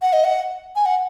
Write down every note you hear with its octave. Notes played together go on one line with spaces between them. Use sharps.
F#5
D#5
F#5
G#5
F#5